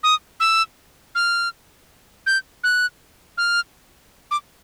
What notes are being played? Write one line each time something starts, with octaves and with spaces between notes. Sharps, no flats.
D#6
E6
F6
G6
F#6
F6
D6